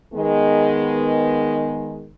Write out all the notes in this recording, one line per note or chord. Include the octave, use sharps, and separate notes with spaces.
D#3 G#3 B3